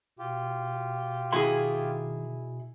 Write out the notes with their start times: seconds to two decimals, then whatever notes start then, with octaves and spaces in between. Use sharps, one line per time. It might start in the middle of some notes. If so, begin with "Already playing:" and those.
0.19 B2 F4 G4
1.32 D#3 E4 F#4 G#4 C6